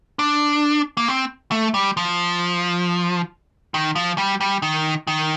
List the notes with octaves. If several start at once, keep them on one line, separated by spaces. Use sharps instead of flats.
D4
A#3
C4
A3
G3
F3
D#3
F3
G3
G3
D#3
D#3